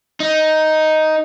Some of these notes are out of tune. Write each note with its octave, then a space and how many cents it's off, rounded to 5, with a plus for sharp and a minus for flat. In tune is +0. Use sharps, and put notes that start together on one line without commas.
D#4 +5